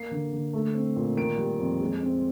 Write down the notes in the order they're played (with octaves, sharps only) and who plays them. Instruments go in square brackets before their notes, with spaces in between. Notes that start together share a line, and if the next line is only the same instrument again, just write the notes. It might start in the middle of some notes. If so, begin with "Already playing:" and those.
Already playing: [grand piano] A#3 C7
D3
D3
A3
C4
A#2
D#3 D7
G3
F2
G#3
C4